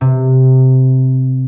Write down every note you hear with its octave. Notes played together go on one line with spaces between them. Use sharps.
C3